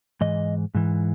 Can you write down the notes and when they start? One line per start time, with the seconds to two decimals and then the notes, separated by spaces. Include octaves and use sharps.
0.21 G#2 E3 D#5
0.75 G#2 E3